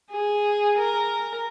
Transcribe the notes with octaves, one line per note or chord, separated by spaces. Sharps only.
G#4
A#4